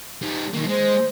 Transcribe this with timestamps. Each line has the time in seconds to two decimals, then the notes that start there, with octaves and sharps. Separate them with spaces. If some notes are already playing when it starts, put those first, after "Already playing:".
0.22 G3 D#4
0.54 B1 D#3 A#3
0.69 G#3 C5